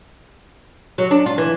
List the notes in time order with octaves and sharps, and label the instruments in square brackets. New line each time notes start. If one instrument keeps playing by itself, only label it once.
[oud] F#3
D4
F4
E3